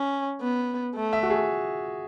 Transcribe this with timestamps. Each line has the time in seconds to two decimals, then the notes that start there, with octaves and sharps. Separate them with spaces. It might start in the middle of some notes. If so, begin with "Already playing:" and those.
Already playing: C#4
0.41 B3
0.95 A3
1.13 E5
1.23 F#4
1.30 G#4